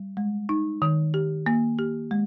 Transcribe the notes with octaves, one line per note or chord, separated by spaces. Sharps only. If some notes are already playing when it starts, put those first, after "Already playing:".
Already playing: G3
G#3
D#4
D#3
G4
A#3
G4
G#3